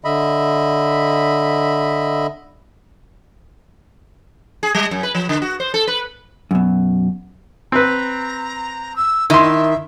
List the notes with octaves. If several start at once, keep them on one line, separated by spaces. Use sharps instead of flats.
D3 D#5 E5 B5
G#4
G3
F#2
B4
F3
D3
F#4
C5
A4
B4
F#2 B2
C4 B4 A#5
E6
D#3 E4 E5 C6